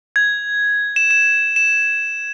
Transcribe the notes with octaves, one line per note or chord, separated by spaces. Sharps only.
G#6
E7
E7
E7